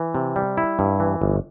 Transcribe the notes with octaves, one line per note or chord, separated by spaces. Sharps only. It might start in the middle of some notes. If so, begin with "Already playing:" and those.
Already playing: E3
C3
G3
E4
G2
E3
G1